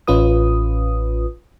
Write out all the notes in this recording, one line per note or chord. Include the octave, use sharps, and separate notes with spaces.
A1 C#4 F4 B4 D#6